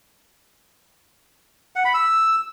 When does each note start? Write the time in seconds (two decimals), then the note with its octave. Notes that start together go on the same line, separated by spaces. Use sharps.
1.76 F#5
1.85 B5
1.94 E6